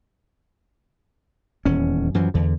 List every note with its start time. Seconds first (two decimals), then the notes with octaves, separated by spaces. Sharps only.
1.65 D#1 E2 C#4
2.15 F#2 E3 F3
2.34 E2 D3